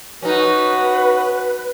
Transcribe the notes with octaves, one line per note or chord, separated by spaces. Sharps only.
C#4 D#4 F#4 B4